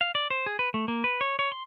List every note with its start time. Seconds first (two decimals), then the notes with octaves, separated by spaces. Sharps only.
0.01 F5
0.15 D5
0.30 C5
0.46 G#4
0.59 B4
0.74 A3
0.88 A#3
1.04 B4
1.21 C#5
1.39 C#5
1.52 C6